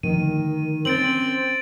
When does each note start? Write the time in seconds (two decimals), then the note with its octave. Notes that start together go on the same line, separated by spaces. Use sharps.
0.03 D3 D#3 F3 A3 D#7
0.85 C4 C#4 A6 D7 F#7